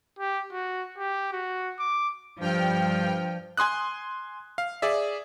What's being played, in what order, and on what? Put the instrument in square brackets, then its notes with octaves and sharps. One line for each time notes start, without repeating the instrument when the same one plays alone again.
[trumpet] G4
F#4
G4
F#4
D6
[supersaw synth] G2 G5 F6 [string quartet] F3
[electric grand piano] G#5 C6 D#6 F#6
F5
G#4 D5 E5